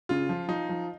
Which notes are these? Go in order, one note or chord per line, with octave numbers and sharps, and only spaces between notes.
C#3 F4
F3
F3 D#4
F3